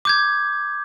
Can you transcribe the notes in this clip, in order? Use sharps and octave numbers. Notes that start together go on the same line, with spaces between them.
D6 G6 G#6